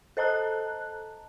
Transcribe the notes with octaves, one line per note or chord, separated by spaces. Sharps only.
A4 C5 D#5 A5 A#5 F#6